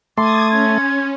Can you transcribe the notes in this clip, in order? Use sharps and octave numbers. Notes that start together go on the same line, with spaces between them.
A3 C6 D6 D#6 G#6 A6
C#4 G#6